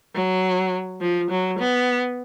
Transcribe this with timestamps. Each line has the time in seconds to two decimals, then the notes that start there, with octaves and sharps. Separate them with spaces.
0.15 F#3
1.01 F3
1.30 F#3
1.58 B3